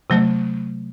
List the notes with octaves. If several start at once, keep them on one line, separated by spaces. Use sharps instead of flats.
C3 F#3 A3